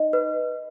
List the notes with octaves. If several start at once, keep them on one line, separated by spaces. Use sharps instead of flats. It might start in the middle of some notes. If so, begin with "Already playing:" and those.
Already playing: D#4 D#5
B4